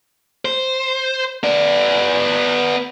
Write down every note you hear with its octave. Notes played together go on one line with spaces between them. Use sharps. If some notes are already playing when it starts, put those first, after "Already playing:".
C5
B3 D5